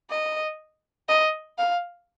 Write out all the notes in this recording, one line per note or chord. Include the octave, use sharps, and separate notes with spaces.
D#5
D#5
F5